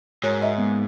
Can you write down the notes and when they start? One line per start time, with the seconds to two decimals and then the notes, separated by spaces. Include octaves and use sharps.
0.23 G#2 F#4 A#4 C#5
0.42 D#5 E5
0.58 G#3 A#3 B3